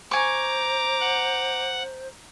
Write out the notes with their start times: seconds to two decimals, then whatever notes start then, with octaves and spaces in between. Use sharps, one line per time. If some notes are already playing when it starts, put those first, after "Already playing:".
0.11 C5 G#5 A#5 C#6 D6
1.00 F#5